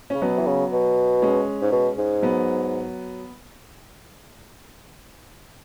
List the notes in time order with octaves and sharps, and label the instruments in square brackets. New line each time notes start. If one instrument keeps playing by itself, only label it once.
[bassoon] C#3 [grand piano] C#4
[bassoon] B2 [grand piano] F#3 B3
[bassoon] E3
C#3
B2
[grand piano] G#3 C#4
[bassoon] G#2
B2
G#2
[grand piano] F#3 B3